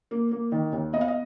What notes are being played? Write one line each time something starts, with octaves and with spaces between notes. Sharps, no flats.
A#3
A#3
D#3
D#2
B3 D#5
F5
D#5